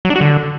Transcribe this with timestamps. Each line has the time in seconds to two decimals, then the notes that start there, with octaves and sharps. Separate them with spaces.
0.05 F#3
0.10 D4
0.16 F#4
0.21 D3